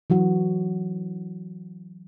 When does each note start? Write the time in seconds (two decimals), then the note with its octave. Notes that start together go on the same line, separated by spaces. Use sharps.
0.10 E3 F#3 F#4